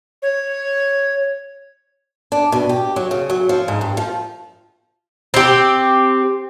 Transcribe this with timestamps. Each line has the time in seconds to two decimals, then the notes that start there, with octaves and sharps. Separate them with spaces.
0.22 C#5
2.32 D4
2.52 B2
2.69 G4
2.96 F#3
3.11 C#3
3.30 F#3
3.49 F3
3.68 G#2
3.81 G2
3.97 F3
5.34 C4 G4